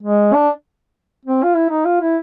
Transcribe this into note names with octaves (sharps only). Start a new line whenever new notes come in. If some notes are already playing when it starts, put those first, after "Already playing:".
G#3
D4
C4
F4
E4
D#4
F4
E4